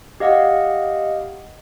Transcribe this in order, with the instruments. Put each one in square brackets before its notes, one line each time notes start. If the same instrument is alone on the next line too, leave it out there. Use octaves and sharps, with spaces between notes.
[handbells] G4 D#5 F5 F#5